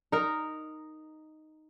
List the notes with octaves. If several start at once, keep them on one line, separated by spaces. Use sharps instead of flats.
D#4 A#4